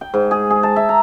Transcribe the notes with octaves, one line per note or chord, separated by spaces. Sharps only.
G5
G#2
G#4
G#4
A5
E5
A#5